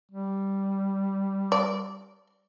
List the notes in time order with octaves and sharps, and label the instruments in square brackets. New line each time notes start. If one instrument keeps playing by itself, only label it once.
[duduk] G3
[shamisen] D5